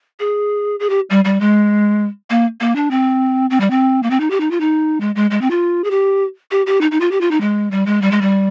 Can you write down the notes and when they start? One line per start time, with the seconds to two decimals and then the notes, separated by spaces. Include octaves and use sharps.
0.20 G#4
0.80 G#4
0.90 G4
1.10 G3
1.25 G3
1.40 G#3
2.30 A#3
2.60 A#3
2.76 D4
2.91 C4
3.50 C4
3.60 G3
3.70 C4
4.03 A#3
4.11 C4
4.20 D#4
4.30 G4
4.40 D#4
4.51 F4
4.60 D#4
5.01 G#3
5.15 G#3
5.31 G#3
5.41 C4
5.50 F4
5.84 G#4
5.91 G4
6.51 G4
6.66 G4
6.81 D#4
6.91 D#4
7.00 F4
7.11 G4
7.21 F4
7.31 D#4
7.41 G#3
7.71 G3
7.86 G#3
8.02 G3
8.11 G#3
8.21 G3